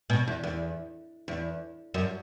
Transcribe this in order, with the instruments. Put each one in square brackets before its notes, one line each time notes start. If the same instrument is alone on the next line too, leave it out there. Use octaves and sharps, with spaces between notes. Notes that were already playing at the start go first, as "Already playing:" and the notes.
[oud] B2
E2
E2
E2
F#2